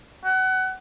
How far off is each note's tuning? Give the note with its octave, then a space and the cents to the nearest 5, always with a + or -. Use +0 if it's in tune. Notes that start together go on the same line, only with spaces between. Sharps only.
F#5 +25